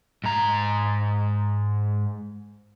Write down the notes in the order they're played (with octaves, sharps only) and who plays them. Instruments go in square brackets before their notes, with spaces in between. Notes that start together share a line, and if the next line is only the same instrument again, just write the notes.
[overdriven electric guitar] G#2 A#5